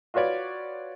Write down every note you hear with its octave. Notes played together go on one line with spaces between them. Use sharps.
F4 F#4 B4 C#5 D5